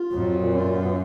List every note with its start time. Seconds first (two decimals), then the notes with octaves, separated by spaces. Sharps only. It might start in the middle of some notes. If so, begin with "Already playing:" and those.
Already playing: F4
0.12 F2 F#3
0.32 A#2
0.52 F#2 F4
0.73 B3